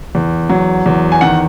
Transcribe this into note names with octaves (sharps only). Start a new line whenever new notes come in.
E2
F#3
E2
G#5
D#3 F#5